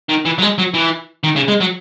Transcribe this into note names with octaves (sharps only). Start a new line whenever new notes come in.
D#3
E3
F#3
G#3
F#3
E3
D#3
C#3
G#3
F#3